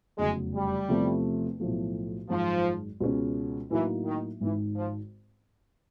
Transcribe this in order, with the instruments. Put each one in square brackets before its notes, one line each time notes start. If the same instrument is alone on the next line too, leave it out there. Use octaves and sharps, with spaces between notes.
[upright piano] F1 E2 C#3 F#3 [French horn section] G#3
[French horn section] G3
[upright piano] E2 C3 F3 A3
B1 A2 F3 A3
[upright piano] G#1 F#2 D#3 G#3 [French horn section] F3
[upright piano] C#2 B2 G#3 C#4
[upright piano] A2 F#3 A#3 D#4 F#4 [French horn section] E3
[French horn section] D#3
[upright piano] G#1 G#2 D#3 [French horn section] E3
[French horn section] F3